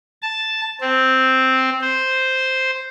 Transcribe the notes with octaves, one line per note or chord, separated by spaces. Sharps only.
A5
C4
C5